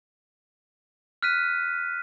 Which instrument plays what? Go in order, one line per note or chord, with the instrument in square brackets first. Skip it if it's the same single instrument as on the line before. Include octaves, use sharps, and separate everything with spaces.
[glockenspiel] F6 F#6 B6 D#7